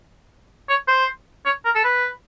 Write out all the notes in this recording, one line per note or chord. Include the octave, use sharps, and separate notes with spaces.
C#5
C5
C#5
A#4
A4
B4